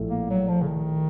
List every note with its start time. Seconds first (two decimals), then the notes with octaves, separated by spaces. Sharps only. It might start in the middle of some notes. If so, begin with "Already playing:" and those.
Already playing: A#1 A2 A3
0.10 A#3
0.30 F#3
0.48 F3
0.62 C#3
0.67 D#3